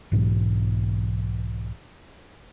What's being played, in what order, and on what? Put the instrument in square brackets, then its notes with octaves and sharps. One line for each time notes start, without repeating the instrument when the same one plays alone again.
[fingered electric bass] B1 G#2 B2 E3